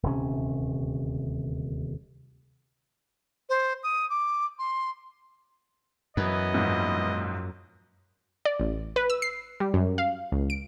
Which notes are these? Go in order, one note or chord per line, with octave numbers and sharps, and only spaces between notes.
D#1 D2 C3 C#4
C5
D#6
D6
C6
F#2 E3 B3 D#5
A#1 G#2
D5
A1
B4
E6
C7
G3
F#2
F5
C#2
D7